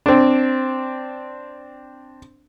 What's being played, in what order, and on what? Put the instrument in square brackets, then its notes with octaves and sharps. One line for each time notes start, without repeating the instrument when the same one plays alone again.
[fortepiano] C4 D4